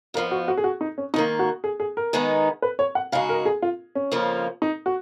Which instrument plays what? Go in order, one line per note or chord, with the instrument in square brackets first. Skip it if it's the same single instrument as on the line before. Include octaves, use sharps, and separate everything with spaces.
[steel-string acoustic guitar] F2 F3 B3 [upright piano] A#4
[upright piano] F#4
F#4
G#4
F#4
D#4
C#4
[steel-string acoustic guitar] G#2 D#3 A#3 [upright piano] D#4
[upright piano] F#4
G#4
G#4
A#4
[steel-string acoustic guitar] D#3 G#3 B3 D#4
[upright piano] B4
C#5
F#5
[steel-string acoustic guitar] C#3 G#3 D#4 F#4 [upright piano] F5
[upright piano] A#4
G#4
F4
C#4
[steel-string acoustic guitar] F2 C#3 F3 A#3 F4
[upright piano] D#4
F#4